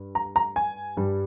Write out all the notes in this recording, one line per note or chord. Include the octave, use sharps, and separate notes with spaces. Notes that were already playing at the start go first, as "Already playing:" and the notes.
Already playing: G2
A#5
A#5
G#5
G2 G3